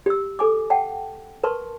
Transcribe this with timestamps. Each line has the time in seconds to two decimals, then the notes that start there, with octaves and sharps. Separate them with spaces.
0.06 G4 E6
0.39 A4 G#5 D6
0.70 F#5 G5 A5
1.44 A#4 B4 A5 C6 C#6